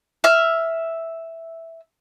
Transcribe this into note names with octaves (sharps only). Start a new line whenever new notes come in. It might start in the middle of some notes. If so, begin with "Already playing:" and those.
E5 F6